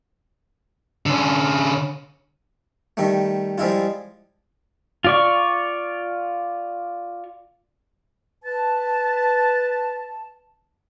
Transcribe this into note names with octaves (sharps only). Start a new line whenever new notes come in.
D3 C#4
D#3 G3 A3
F3 G3 G#3 E4 F4
F4 D5 C#6
B4 A5